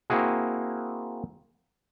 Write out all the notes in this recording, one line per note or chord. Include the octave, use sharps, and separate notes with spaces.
A#3 C4 E4 F#4 G#4